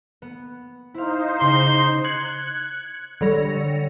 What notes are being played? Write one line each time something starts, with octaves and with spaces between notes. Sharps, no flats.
B3
D#4 E4 C5 F5
C#3 C6 D6 A#6
F#6 G#6 C#7 F#7
D3 G3 C#5 A#6